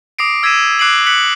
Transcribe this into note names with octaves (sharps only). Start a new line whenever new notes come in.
D6 D#6 A#6 C7 D7
E6 G#6 A#6 B6 D#7 E7
D6 F#6 C7 D7 D#7 F#7
F#6 B6 C#7 F#7